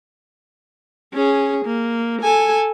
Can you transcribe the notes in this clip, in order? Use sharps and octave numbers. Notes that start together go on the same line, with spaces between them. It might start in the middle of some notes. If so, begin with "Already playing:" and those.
C#4 G#4
A#3
A4 G#5